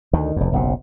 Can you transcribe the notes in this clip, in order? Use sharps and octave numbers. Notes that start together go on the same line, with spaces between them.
D2 D#3
F1 E2
F#1 B1 C3